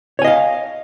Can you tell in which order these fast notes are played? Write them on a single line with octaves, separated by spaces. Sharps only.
C#5 G#5 D#5 F5